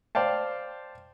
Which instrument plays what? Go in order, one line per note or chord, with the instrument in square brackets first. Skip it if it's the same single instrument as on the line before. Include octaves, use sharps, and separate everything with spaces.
[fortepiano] C5 D5 F5 G5 A5